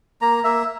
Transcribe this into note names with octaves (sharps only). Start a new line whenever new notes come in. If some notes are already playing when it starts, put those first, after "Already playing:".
A#3 A#5
A#3 E5